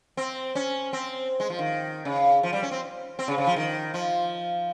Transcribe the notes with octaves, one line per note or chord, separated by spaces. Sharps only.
C4
C#4
C4
G#3
F3
D#3
C#3
F3
G3
C#4
C4
C4
C#3
C#3
F3
D#3
F3